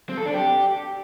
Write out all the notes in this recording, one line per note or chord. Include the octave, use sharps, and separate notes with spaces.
C4
A4
D4
G4